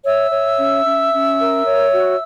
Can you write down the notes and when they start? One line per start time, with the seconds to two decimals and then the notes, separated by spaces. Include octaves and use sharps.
0.05 C#5 E5 E6
0.32 C#5
0.59 C#4
0.85 C#4
1.13 C#4
1.39 A#4
1.66 C#5
1.93 F#4